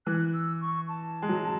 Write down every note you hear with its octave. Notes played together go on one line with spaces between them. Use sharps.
E3 F#6
E6
C#6
A5
G#3
F#3